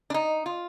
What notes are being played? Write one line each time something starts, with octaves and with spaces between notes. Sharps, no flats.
D4
D#4
F4